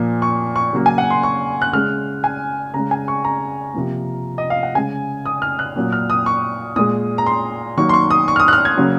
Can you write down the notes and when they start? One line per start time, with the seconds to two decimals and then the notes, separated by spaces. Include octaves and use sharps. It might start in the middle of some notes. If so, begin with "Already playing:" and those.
Already playing: A#2 F3 A#3
0.22 C#6
0.56 C#6
0.73 C#3 F#3 A#3
0.86 G#5
0.98 F#5
1.10 C6
1.23 C#6
1.62 F#6
1.73 C#3 G#3 F6
2.24 G#5
2.74 C#3 G#3 A#5
2.91 G#5
3.08 C#6
3.24 A#5
3.74 C3 F3 A#3
4.38 D#5
4.50 F5
4.63 F#5
4.75 C#3 G#3 G#5
5.26 D#6
5.42 F6
5.59 F#6
5.76 A#2 F#3 A#3
5.92 F6
6.10 D#6
6.26 C#6
6.76 A#2 G#3 D#6
7.18 A#5
7.26 C6
7.77 D#3 F#3 A#3 C#6
7.89 C6
7.93 C#6
8.10 D#6
8.28 C#6
8.36 F6
8.40 D#6
8.48 F#6
8.53 F6
8.65 G#6
8.77 C#3 F#3 A#3